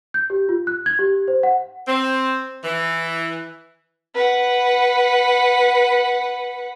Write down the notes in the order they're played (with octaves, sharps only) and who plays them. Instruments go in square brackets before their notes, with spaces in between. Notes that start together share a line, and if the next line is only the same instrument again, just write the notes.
[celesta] G6
G4
F4
F#6
G#6
G4
C5
F#5
[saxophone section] C4
E3
[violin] B4 F#5